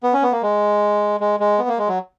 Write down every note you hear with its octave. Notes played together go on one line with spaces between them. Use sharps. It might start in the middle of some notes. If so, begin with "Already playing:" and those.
B3
C#4
B3
A#3
G#3
G#3
G#3
B3
A#3
G#3
F#3